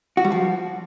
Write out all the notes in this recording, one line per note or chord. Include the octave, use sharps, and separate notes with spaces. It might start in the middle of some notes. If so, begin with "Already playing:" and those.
F#4
G3
F3